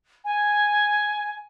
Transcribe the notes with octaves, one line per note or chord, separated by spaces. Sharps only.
G#5